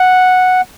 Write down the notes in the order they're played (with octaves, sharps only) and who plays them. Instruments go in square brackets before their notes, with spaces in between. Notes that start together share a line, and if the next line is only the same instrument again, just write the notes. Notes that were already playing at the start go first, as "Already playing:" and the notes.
Already playing: [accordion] F#5